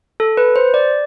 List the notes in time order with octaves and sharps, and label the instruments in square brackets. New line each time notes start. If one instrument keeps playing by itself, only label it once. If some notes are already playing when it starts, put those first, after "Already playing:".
[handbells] A4
B4
C5
D5